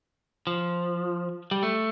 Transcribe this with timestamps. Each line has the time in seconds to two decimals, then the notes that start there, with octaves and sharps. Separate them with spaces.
0.47 F3
1.51 G3
1.63 A3